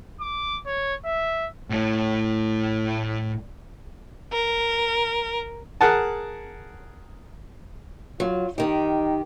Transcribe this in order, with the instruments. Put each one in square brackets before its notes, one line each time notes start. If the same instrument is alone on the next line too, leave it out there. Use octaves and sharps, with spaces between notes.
[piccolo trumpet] D6
C#5
E5
[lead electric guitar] A2 A3
[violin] A#4
[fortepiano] G#4 A#4 F#5 A5
[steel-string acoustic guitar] F#3 [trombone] F4
[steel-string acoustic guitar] D#3 G4 [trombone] D#4